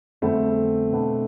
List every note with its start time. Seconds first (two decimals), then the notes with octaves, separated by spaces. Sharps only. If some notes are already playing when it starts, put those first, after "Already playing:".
0.22 F2 D3 G3 A3 B3 C4
0.92 B2 B3 D4